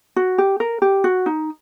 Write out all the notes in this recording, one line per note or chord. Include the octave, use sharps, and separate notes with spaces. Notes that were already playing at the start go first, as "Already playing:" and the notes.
F#4
G4
A#4
G4
F#4
D#4